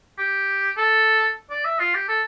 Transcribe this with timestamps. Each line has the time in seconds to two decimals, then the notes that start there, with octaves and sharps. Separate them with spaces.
0.19 G4
0.77 A4
1.50 D5
1.65 E5
1.79 F4
1.94 G4
2.09 A4